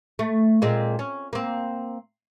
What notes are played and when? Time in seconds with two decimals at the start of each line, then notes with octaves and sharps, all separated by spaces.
0.19 A3
0.62 A#2 G#3 C4
0.99 C#4
1.33 A#3 C4